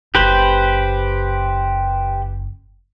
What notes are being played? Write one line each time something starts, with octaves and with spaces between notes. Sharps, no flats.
F#1 G4 B4 C5